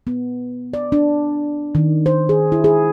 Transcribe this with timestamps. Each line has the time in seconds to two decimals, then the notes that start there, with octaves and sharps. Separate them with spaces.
0.07 B3
0.73 D5
0.92 D4
1.75 D#3
2.06 C5
2.29 G#4
2.52 E4
2.64 G#4